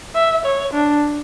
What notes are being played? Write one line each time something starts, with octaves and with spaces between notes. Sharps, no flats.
E5
C#5
D4